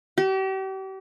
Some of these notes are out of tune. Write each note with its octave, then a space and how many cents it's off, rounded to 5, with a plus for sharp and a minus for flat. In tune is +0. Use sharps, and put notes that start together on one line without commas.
G4 -40